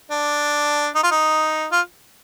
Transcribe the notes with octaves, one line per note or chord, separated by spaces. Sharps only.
D4
D#4
F4
D#4
F4